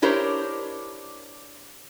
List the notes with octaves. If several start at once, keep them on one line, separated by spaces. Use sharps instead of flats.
D4 E4 G4 A#4 C5 C#5